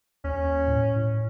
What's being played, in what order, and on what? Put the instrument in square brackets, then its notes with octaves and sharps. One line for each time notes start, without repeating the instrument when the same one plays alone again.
[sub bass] D#2 [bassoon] C#4
[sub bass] A2
A2